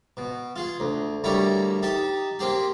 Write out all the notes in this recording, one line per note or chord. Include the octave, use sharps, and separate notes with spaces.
B2
F4 G#4
D2
D2 G3 A#3 E4 C#5 A#5
D#4 G4 A5
A#3 C4 G4 G#4